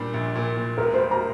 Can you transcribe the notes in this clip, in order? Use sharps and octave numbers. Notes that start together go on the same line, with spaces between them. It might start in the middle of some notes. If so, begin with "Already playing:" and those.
Already playing: A#2 G3 D4
A#1
A#2
A#2
E1 A#4
C5
G3
A#5